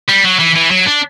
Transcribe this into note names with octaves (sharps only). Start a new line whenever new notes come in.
G3
F#3
E3
E3
F#3
D4